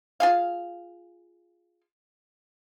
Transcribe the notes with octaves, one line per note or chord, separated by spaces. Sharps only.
F4 G#4 F5